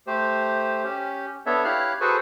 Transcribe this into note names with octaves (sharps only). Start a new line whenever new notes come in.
A3 G4 C5
C#4 G4
B3 D4 A4 C#5 E5
E4 G4 C#5 F5 F6 F#6
F#4 G#4 A4 B4 C5 C#6